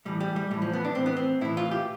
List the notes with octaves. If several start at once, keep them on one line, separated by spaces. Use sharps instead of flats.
A2 E3 G3
G3
G3
A2 E3 G3
F3
B3
D4
A2 E3 C4
B3
C4
A2 E3 E4
F4
G4